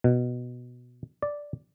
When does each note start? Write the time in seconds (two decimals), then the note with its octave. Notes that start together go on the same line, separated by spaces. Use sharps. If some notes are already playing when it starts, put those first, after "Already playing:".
0.04 B2
1.22 D5